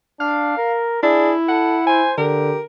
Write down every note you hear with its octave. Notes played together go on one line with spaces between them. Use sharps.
D4 F5
A#4
D4 E4 G#4
A4 F#5
C5 G#5
D3 G4 A#4